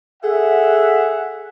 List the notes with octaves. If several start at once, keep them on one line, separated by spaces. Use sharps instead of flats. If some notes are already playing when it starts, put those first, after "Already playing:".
G#4 A4 E5 F#5